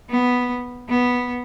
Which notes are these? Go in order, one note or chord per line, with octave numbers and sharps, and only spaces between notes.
B3
B3